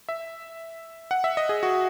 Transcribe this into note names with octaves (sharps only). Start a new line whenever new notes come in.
E5
F#5
E5
D#5
G#4
F#4